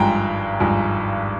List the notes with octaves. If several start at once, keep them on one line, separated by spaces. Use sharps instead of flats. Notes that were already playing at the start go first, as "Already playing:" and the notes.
Already playing: G#1 G2 F3 G#3 G5 A#5
G#1 G2 F3 G#3